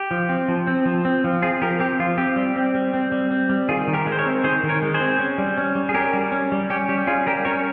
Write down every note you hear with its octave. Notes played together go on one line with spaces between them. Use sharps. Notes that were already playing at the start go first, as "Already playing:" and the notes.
Already playing: G4
F3
C4
F3
C4
F3
C4
F3
C4 F4 G#4
F3 G4 A#4
C4 G4
F3 F4
C4 G4
G3
C4
G3
C4
G3
C4
G3
D#3 F4 G#4
D#3
G4 A#4
G#3
C5
A#4 C#5
C4
D#3 G#4 C5
D#3
A#4 C#5
G#3
G#4 C5
C4
C#4
G3
C#4
G3
G#4
C#4 G4 A#4
G3
C#4
G3
C#4 G4
G3 G4
C#4 F4 G#4
G3 G4 A#4
C#4 A#4 C#5